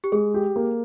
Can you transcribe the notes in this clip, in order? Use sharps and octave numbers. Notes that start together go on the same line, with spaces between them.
G4
G#3 G#4
G4
A#3